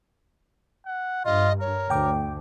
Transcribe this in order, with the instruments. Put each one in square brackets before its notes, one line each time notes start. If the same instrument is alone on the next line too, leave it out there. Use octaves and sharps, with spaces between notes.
[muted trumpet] F#5
[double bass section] G2 [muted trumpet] F4 [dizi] D#5
[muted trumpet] A#4 [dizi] C#5
[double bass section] D2 [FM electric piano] G5 D6